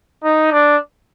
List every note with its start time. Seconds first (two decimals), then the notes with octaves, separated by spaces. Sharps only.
0.24 D#4
0.52 D4